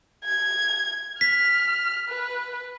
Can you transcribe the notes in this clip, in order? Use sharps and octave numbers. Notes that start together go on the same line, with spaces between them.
G#6
F6 B6
B4